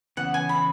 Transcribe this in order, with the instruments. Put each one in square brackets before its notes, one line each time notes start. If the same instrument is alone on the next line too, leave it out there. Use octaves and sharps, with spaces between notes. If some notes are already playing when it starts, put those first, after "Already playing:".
[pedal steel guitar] C#3 E3 B3 [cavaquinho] F#5
[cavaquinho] G#5
B5